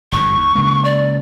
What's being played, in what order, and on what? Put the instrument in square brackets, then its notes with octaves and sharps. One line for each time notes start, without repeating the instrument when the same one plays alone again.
[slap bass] G1 F2 G#2 [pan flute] C#6
[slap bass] D#2
C#3 G#3 A#3
[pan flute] D5